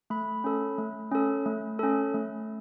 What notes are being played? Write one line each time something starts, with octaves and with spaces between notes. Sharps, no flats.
A3 B5
C#4 A4
A3
C#4 A4
A3
C#4 A4
A3